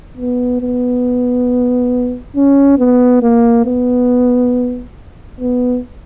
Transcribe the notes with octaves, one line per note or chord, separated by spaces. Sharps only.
B3
B3
C#4
B3
A#3
B3
B3